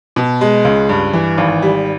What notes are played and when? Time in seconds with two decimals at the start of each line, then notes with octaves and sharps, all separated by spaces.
0.16 B2
0.41 G#3
0.65 C#2
0.89 G2
1.13 E3
1.38 G#1
1.62 G3